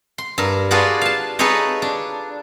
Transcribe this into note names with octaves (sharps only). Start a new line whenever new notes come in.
C6
G2 A#4
D4 F4 F#4 G#4 B4 D5
F5 A5
D#4 G#4 A4 B4 C#5 D#5
D4